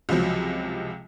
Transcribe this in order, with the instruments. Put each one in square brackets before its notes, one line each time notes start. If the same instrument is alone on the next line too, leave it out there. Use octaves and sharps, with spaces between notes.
[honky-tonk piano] C#2 C3 F3 F#3